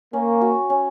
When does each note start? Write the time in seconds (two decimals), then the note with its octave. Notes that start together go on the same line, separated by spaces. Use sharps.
0.13 A#3 C#4
0.41 F#4
0.70 C#4